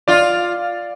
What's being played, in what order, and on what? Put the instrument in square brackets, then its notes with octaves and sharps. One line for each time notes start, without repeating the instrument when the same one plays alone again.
[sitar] F4 [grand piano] D5